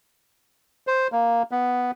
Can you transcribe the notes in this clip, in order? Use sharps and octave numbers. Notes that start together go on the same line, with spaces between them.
C5
A#3
B3